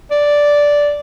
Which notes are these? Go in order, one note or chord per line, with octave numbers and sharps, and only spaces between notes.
D5